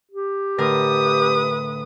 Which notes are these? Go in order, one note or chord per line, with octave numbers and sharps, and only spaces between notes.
G4
A2 D3 A#4 B4 D#6